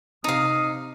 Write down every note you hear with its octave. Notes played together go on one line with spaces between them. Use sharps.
C3 D#4 F5 D#6